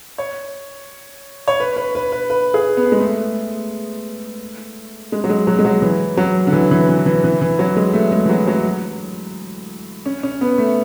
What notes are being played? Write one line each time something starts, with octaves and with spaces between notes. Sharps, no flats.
C#5
C#5
B4
B4
B4
B4
B4
G#4
B3
G#3
A3
G#3
F#3
G#3
F#3
G#3
F#3
E3
F#3
D3
E3
E3
E3
E3
E3
E3
F#3
G#3
A3
G#3
E3
F#3
F#3
C#4
C#4
B3
A3